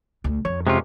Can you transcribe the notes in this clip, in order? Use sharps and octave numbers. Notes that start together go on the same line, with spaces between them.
D2
F2 C#5
C3 G#3 C#4 F4